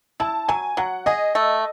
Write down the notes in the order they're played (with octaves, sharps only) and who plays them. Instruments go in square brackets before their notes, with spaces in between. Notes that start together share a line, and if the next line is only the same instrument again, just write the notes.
[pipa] E4 [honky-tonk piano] A5
[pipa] F#3 [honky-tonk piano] G#5
[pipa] F#3 [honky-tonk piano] F#5
[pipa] G#4 [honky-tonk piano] D#5
[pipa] A3